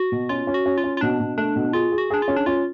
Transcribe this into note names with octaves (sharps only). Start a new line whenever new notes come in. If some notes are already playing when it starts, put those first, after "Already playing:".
Already playing: F#4
B2
C#4 F4
C#4
F#4
C#4
F4
C#4
F4
B2 D4
B2
A3 D4
B2
F4 G#4
G#4
F#4
D4 G#4
F4
C#4
D4
C#4 F4